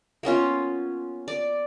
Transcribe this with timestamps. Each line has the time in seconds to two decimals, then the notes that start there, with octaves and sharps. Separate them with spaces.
0.23 A#3 B3 C#4 F4
1.28 D5